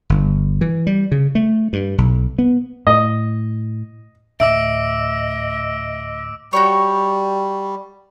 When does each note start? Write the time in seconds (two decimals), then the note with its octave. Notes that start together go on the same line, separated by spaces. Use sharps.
0.10 G1
0.61 E3
0.87 G3
1.12 C#3
1.35 A3
1.73 G2
1.98 B1
2.39 B3
2.87 A2 D#5
4.40 D2 A2 D#5 E5 D6 E6 D7
6.53 G3 F#4 G4 C#5